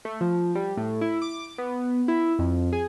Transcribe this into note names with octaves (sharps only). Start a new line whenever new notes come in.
A3
F3
G3
A2
E4
D6
B3
E4
F2
G#4